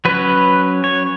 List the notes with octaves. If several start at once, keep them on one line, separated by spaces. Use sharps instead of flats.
F#3 C#4 B4
C#5